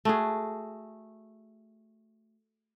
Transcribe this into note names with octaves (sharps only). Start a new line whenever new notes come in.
A3 F#4 G#4